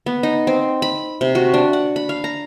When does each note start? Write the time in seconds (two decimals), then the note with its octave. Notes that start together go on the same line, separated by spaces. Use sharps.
0.06 B3
0.23 D#4
0.47 C4
0.82 B5
1.21 C3
1.35 F#4
1.54 D4
1.73 F#5
1.96 B5
2.09 F5
2.24 A#5